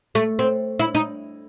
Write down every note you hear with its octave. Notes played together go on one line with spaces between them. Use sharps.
A3
C4
E4
D#4